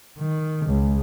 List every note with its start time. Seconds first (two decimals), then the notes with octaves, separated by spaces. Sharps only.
0.19 D#3
0.66 C#2